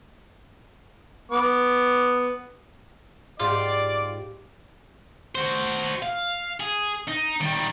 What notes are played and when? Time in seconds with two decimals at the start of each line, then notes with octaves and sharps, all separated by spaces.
1.32 B3 D6
3.40 G#2 F4 G4 D5 D6
5.35 F#4 C5
6.03 F5
6.60 G#4
7.08 D#4
7.41 D#3 G3